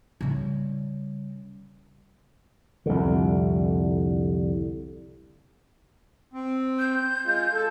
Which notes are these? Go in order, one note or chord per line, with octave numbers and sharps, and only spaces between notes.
C#3 G3
C2 F2 D3
C4
G6
G#3 F4
A4